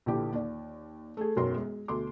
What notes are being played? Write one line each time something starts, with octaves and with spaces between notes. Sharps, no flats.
A#1 D3 E3 G4
D#2 D5
A3 G#4
E1 B1 F#2 A#4 C#5 C6
G#3
D2 B2 A4 C6 D6